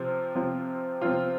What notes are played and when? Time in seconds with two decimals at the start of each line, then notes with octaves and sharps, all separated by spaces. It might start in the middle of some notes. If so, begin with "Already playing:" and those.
Already playing: C3 F3 C4 F4
0.35 C3 F3 C4 F4
1.02 C3 F3 C4 F4